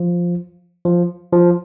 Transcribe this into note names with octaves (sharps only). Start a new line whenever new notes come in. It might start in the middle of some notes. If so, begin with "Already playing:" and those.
Already playing: F3
F3
F3